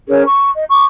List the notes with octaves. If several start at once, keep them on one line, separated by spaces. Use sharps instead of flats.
C#4 G#4 A#4 C#5
C#6
D#5
C#6 D6